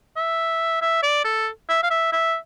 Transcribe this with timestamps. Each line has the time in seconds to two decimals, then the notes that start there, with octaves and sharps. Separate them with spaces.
0.16 E5
0.81 E5
1.03 D5
1.25 A4
1.69 E5
1.83 F5
1.90 E5
2.12 E5